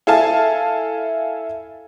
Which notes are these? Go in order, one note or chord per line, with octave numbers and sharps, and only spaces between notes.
E4 A4 F5 G#5 A5